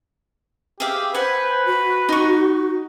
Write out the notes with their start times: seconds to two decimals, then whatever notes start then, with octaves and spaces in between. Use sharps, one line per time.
0.80 G4 G#4 E5 F5
1.15 B4 C5 F#5 G#5
1.66 F#4
2.09 D#4 C#6